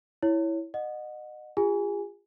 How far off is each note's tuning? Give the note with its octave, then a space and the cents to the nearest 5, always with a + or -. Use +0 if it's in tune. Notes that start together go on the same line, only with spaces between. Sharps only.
E4 +0 C#5 +0
D#5 -25 F#5 -20
F4 +0 G#4 -40 G#5 +0